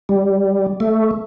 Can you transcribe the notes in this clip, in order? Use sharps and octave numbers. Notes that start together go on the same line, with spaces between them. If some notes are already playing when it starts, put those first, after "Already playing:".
G3
A3